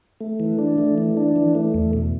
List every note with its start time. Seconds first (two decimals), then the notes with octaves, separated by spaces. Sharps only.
0.21 A3
0.40 E3
0.59 D4
0.78 A3
0.98 E3
1.17 D4
1.36 E3
1.55 A3
1.74 E2
1.93 B2